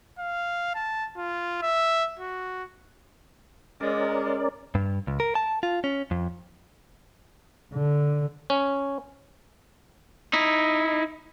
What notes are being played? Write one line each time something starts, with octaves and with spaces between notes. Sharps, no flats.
F5
A5
F4
E5
F#4
G#3 C#4 A#4 D5
G2
C#2
A#4
A5
F4
C#4
F2
D3
C#4
D#4 E4